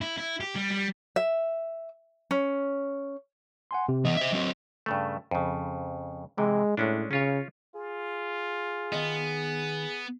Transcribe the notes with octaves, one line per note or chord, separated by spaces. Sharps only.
E4
E4
G4
G3
G3
E5
C#4
F#5 G#5 C6
C3
E3 B3 D#5
C5 E5
F#3 C4
G2 C#3 A3
F2 C#3
C3 E3 G#3
A2 G#3 C#4 D4
C#3 C#4 F4 C#5
F4 G#4
D#3 B3 D#5